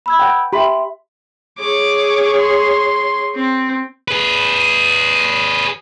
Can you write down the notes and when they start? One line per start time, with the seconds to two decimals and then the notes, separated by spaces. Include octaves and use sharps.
0.06 B5 E6 G#6
0.19 F#5 G5
0.53 G4 E5 B5 C6
1.59 G#4 C#5 D6
2.39 C6
3.36 C4
4.08 G#4 B4